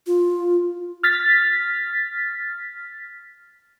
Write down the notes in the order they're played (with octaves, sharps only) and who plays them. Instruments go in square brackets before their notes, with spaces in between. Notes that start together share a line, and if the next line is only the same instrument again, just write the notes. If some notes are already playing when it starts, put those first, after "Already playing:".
[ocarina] F4
[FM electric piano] F6 A6 B6